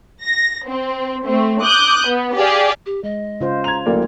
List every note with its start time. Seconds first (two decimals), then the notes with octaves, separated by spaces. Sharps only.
0.24 A#6
0.67 C4
1.26 A3 C4
1.63 D6 D#6 F#6 G6
2.07 B3
2.36 G4 G#4 D5 F5 G#5
2.86 G4
3.04 G#3 D#5
3.41 C#3 F4 C5
3.64 A#5 G#6 F7
3.86 D1 A#3 A4 D5